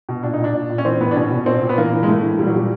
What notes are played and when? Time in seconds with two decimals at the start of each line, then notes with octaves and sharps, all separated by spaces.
0.09 B2
0.23 A#2 D4
0.33 D#4
0.39 A#2
0.44 D4
0.54 A#2
0.69 A#2
0.78 C#4
0.85 E3 C4
1.01 A2 B3
1.11 D4
1.15 B2 C#4
1.31 B2
1.46 A#2 C4
1.62 A#2
1.69 B3
1.77 E3 A#3
1.93 E3
2.03 G#3
2.08 A2 A3
2.23 E3
2.39 A#2 G3
2.47 F#3
2.54 A#2 G3